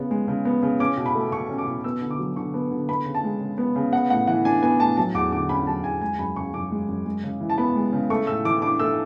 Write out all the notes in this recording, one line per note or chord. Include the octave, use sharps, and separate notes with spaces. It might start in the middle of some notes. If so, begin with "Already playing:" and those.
Already playing: C#3 B3
G#3
C#3
B3
C#3
C#4 D6
B2
B5
A3
B2 C#6
C#4
D6
B2
B3 E6
D3
D6
F#3
D3 C#6
B3
D3
B3 B5
C#3
A5
G#3
C#3
B3
C#3
B3 F#5
A2 F#5
E3 F#5
D4 G#5
B3 G#5
A2 A5
F#3 A5
E2 D6
D3 D6
C#4 B5
F#3 A5
E2 G#5
G#3 G#5
F#2 B5
C#3 C#6
F#2 D6
G#3
F#2
G#3
C#3
E3
A5
B3 B5
G#3
C#3
A3 C#6
A2 E6
E3 D6
D4 D6
A3 E6